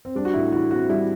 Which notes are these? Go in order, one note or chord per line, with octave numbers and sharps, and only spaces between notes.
C4
G3 D4
F#4
A2 E4
E3 F#4
C4 F#4
G3 E4